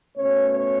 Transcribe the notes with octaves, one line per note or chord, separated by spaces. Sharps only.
B2 A3 C#4 C#5
C#5